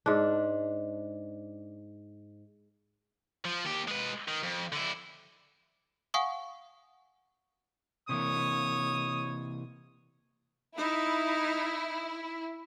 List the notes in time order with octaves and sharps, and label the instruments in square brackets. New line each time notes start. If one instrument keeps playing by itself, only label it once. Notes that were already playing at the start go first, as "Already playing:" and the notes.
[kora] G#2 D4
[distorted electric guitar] F3
D#2 G4
G#3 B4
D#3
F2
D3 E4
[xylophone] F5 F#5 G#5 C#6 D#6
[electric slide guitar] C3 E3 A#3 [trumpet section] C#5 D#6
[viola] D#4 [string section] E4